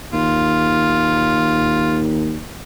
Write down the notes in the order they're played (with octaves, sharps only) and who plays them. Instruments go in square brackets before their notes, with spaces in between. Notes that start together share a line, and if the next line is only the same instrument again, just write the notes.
[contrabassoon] D#2 [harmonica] F4